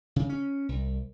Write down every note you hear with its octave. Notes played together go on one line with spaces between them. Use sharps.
C#3
C#4
C2